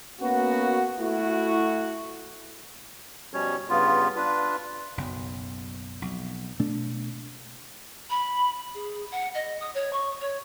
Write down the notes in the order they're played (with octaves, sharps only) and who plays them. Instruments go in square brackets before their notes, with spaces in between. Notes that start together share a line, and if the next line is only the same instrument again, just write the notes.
[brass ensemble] A#3 B3 C#4 F#4
A3 E4 F#4
[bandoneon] B2 F3 G3 C#4 C#5
G2 C#3 B3 F4
D4 F4 B4
[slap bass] F#1 B1 F#2
B1 F2
B2 A3 D4
[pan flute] B5
G#4
F#5
D#5
D#6
C#5
C#6
C#5